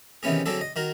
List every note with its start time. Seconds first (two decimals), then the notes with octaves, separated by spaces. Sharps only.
0.23 C3 D#3 E3 B3 C#4 G#4
0.46 D3 F#3 C4 D4 G#4 A4
0.61 D#5
0.76 D#3 F#4 A#4